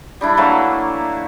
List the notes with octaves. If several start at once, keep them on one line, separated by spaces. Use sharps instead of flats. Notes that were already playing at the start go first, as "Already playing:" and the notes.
G3 D4 E4
E3 F#3 A3 A#3